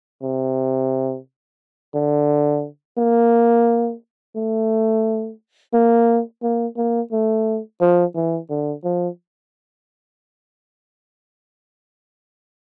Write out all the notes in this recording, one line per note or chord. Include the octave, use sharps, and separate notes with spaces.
C3
D3
A#3
A3
A#3
A#3
A#3
A3
F3
E3
D3
F3